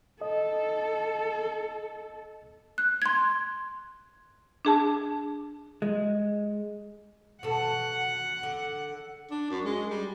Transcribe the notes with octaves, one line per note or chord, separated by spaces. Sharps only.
A4 D#5
F#6
C6 G#6
D4 G#4 A5
G#3
B2 A4 F#5
D3
D4
F#2
G#3
G3